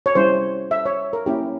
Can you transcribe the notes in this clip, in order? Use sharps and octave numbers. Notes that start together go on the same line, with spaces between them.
C#5
G3 C#4 E4 C5
E5
C#5
A#4
A#3 C#4 E4 G4